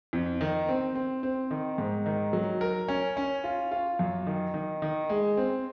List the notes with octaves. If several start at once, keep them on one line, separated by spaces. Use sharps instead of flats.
F2
D#3
C4
C4
C4
D#3
G#2
D#3
F#3
A#4
C#4
C#4
F4
F4
F#2
D#3
D#3
D#3
G#3
C4